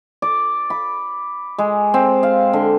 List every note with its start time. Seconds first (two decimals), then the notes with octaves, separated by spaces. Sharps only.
0.22 D5
0.70 B5
1.58 G#3
1.94 C4
2.23 F5
2.53 D3